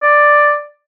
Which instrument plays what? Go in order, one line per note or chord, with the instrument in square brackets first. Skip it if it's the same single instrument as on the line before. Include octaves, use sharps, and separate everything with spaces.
[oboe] D5